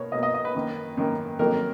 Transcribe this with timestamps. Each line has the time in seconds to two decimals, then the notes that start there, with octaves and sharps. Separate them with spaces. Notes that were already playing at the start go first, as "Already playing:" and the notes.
Already playing: B2 A#3 C#5
0.12 B2 A#3 D#5
0.23 D#5
0.34 D#5
0.45 B4
0.55 F#2 D#3 A#3
0.97 F#2 D#3 A#3
1.39 F2 D#3 F#3 A#3 A#4